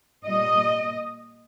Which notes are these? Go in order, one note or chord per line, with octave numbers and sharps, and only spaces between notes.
A#2 G3 D#5